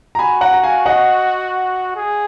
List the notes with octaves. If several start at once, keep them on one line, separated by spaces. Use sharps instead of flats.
A#5
F#4 G#5 B5
F#5 A#5
A#5
F5 G#5
D#5 F#5
G#4